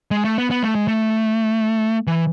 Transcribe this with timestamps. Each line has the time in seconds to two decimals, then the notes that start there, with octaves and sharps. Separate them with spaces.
0.11 G#3
0.25 A3
0.38 B3
0.51 B3
0.63 A3
0.75 G#3
0.88 A3
2.07 E3